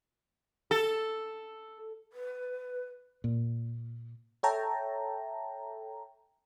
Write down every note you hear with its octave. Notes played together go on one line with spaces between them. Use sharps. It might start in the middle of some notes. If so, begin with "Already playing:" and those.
A4
B4
A#2
A4 C#5 E5 G5 A5 A#5